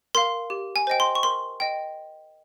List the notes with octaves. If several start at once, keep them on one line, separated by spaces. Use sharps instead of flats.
A#4 F5 C6
G4
G#5
C5 D#5 G5
C6
C#6
A#4 C6
D#5 G5